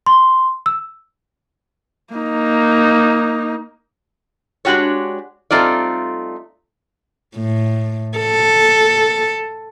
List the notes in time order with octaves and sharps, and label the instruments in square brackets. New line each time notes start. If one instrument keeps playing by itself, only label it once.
[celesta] C6
E6
[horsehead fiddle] A#3 D#4
[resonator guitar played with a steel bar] G#3 D4 F#4 G4 C#5
G3 A3 C4 D#4 F4 D5
[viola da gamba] A2
A4